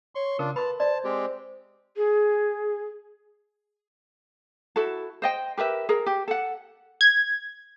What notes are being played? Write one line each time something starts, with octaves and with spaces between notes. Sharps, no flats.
C#5 C6 C#6
C#3 D4 F4 A#4
B4 A5 B5 C6
C5 D5 A5
G#3 C4 G4
G#4
E4 F#4 A4
C5 D#5 G5
G4 A#4 B4 E5
G#4 A#4
G4
A4 F#5
G#6